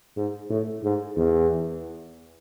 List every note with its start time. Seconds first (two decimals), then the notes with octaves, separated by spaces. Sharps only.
0.16 G#2
0.50 A2
0.83 G#2
1.16 E2